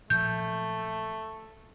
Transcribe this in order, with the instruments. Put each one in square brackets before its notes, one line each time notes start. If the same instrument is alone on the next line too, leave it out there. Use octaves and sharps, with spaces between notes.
[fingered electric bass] A#2 F3 F#3 [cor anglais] A3 [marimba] G6